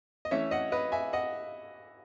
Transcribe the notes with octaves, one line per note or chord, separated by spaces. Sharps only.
D#5
E3 A3 C#4 C#5 E5
D#5 F#5
B4 D#5
E5 G#5
D#5 F#5